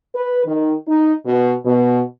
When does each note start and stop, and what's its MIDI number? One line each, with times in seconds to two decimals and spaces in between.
0.15 0.44 71
0.45 0.73 51
0.88 1.13 63
1.26 1.53 47
1.65 2.01 47